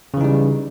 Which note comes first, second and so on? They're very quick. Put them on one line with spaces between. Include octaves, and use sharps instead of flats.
C#3 E3 D#4 G3